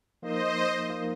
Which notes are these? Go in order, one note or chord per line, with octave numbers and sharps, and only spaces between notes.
F3 A#3 D#4 A#4 C5 D#5
F3 A#3 D#4 A#4